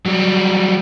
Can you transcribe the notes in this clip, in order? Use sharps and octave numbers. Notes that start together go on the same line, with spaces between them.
F#3 G3